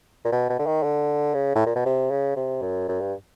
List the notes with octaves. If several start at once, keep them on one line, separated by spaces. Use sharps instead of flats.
A#2
B2
B2
D3
D#3
D3
C#3
A2
A#2
B2
C3
C#3
C3
F#2
F#2
G2